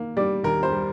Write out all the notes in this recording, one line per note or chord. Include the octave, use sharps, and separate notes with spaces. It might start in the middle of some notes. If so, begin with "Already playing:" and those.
Already playing: D#3 A#3
G3 D5
D#2 A#4
C5
G3